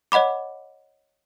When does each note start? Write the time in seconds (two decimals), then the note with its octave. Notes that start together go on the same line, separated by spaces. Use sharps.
0.12 C#5 D#5 F#5 B5 D6